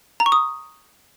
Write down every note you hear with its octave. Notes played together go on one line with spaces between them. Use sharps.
A#5
C#6
D#6